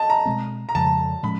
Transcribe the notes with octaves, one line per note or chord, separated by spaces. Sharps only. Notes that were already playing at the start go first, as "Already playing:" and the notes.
Already playing: D#5 A5
A#5
B2 G#3 C4
A#5
F2 C#3 F3 G#3 A5
A2 F3 G#3 C#4 B5